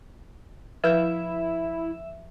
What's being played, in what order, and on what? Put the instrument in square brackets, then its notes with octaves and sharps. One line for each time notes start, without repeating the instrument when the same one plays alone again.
[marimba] F3 G6 [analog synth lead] E4 [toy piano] B4 [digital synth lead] E5